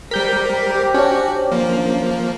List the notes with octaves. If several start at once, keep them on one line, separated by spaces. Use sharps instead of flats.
G3 G4 A#4 C5 G6 B6
C#4 D4 F#4
F3 A#3